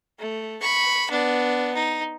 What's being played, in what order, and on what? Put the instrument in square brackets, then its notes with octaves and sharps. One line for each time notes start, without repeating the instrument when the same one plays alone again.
[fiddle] A3
B5 C#6
B3 D4
D#4